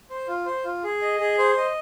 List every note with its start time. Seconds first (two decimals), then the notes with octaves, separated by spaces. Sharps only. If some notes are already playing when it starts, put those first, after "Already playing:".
0.10 C5
0.27 F4
0.46 C5
0.64 F4
0.84 G#4
1.02 D#5
1.20 G#4
1.38 C5
1.57 D#5